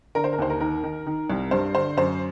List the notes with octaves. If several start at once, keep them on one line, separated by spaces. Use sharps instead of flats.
D3 A#4
C5
A#4
D#2 C5
A#4
D#3 A#4
D#3
D#3
C2
G2 C5
D3 C5
F#2 C5